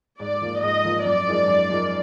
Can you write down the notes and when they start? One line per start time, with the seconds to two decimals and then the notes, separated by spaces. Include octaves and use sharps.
0.20 G#2 D5
0.41 F3 A#3 F4 A#4
0.63 G#2 D#5
0.85 F3 A#3 F4 A#4
1.06 F#2 D5
1.27 F3 G#3 D#4 A#4
1.48 F#2
1.70 F3 G#3 D#4 A#4